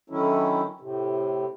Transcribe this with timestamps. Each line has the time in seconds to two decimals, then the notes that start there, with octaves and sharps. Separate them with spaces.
0.10 D3 D#3 F#3 C#4 E4
0.81 A2 C3